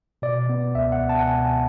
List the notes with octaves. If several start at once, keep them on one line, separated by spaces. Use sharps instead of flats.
B2 D5
B3
C#2 E5
F#5
C#2
A5
F#5
B2 G#5